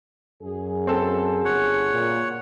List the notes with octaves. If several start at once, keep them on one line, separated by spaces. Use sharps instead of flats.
F#2 F#4 G#4
C4 A4
G1 C#5 F#5
A#2